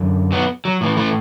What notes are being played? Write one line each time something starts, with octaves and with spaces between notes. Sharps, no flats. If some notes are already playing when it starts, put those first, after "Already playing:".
Already playing: F#2 D3
F#3 B3
F#3
A2 E3
E3 A3